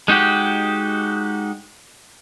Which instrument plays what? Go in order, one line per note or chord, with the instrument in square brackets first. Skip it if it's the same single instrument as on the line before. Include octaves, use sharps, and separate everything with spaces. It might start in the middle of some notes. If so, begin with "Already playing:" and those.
[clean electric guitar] G#3 D#4 F#4 G4